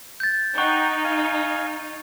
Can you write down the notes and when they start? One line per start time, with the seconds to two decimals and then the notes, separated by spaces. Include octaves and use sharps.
0.20 G6 A6
0.58 D#4 F#5 G5 C#6
1.05 F5 G#5